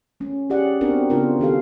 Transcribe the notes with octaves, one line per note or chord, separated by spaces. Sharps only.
A3 C#4
C#4 G4 G#4 D5 F#5
B3 C4 D4 F#4 A#4
C#3 B3 D4 F4 F#4 A#4
D#3 G4 A4 F5